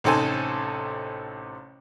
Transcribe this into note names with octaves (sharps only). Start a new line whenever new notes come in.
A1 C3 D#4 A4 C5 G#5